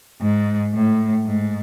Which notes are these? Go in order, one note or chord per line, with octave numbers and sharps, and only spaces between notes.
G#2
A2
G#2